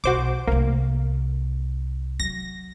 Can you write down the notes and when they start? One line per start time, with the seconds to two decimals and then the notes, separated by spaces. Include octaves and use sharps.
0.04 B1 F#4 C5 D6
0.47 C2 A3 A#3
2.20 F#3 A#6